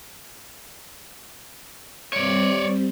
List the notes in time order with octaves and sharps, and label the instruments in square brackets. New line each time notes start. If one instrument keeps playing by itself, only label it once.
[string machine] G3 C4 [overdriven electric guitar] C#5 D5